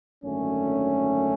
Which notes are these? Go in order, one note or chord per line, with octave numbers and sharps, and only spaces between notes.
G#1 F#2 D3 A3 C#4